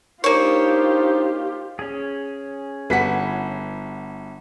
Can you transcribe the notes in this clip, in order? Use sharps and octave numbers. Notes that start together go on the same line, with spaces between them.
A#3 D4 D#4 F4 G4 C5 C#5
C#4 G#4
G1 F#4 B4 F#5 B6